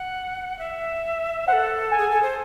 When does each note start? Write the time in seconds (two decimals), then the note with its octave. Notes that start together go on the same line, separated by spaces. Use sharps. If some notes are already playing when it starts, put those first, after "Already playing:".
Already playing: F#5
0.59 E5
1.48 A4 C5 F#5
1.92 G#5
1.98 G#4
2.11 A4
2.22 C5